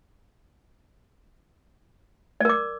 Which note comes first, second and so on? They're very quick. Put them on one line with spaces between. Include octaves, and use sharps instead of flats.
D5 A#4 D6